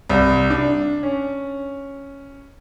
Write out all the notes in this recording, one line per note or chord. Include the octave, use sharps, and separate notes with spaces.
C2
D4
C#4